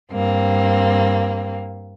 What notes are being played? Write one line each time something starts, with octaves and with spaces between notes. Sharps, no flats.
G2 A#3 C4